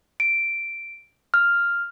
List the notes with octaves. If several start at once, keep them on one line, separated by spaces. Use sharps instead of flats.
D7
F6